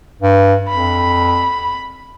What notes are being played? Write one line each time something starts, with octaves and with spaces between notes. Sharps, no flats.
G2
F2 B5